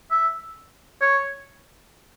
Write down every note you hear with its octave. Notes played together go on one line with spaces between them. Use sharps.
E5
C#5